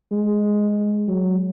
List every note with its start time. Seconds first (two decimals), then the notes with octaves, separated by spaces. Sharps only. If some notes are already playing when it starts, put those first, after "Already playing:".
0.11 G#3
1.08 F#3